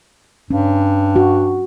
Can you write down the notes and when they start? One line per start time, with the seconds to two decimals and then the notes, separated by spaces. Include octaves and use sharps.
0.51 G2 C#4
1.16 F#4